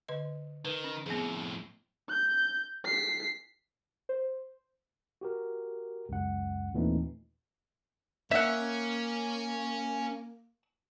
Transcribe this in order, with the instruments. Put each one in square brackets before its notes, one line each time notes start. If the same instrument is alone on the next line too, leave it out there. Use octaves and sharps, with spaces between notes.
[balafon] D3 B4 D#5
[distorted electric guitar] D#3 [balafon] B4
[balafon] C#4
[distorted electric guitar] F2 A2 [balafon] B3 G#4
[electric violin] G6
B6 C7
[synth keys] C5
[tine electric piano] F#4 G4 A#4
C#2 F#2 F#5
D#2 A#2 E3 A3 C4 D#4
[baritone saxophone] A#3 [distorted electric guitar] C#4 [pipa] E5 F#5